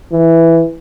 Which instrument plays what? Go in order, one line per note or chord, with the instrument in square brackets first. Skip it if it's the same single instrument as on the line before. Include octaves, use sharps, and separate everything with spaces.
[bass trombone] E3